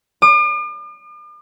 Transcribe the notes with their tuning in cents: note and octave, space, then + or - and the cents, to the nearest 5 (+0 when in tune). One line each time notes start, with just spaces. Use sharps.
D6 +45